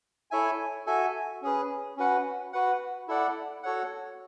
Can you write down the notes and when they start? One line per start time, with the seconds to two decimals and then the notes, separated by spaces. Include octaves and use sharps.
0.31 E4 A4 C#5 E5 G#5
0.86 F#4 A4 E5 G#5
1.42 C#4 G#4 B4
1.97 C#4 F#4 B4 F#5
2.53 F#4 B4 F#5
3.08 E4 A4 D5 F#5
3.63 F#4 A4 C#5 F#5